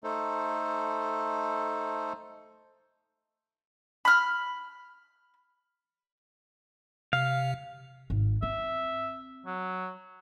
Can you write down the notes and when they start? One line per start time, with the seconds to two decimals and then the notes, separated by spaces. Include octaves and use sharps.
0.04 A3 D#4 A4 C5
4.05 B5 F6
7.13 C3 F5
8.10 G#1
8.43 C4 E5
9.46 F#3